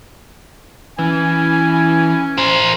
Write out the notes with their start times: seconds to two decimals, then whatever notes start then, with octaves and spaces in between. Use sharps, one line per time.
0.99 E3 C#4 G#5
2.38 A#4 C5